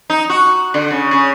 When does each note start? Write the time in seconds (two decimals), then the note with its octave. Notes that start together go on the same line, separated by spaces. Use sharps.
0.10 D#4
0.30 F#4
0.74 D3
0.91 C#3
1.11 C#3